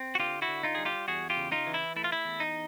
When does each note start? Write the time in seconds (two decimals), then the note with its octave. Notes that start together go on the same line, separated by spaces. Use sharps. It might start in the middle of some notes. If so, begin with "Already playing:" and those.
Already playing: C4
0.15 F#4
0.19 D3 F4 G4
0.42 E4 F#4
0.48 D3
0.63 D#4 F4
0.75 G3 G#4
0.85 F4 G4
1.08 E2 F#4 G#4
1.30 F4 G4
1.37 C#3
1.52 D#4 F4
1.67 E3
1.74 E4
1.96 A3 E4
2.04 F4
2.12 E4
2.25 E2
2.40 D#4